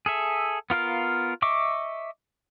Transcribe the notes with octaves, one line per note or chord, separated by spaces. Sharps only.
G#4 A4 E5
B3 F4 A#4 F5
D#5 E5 C#6 D6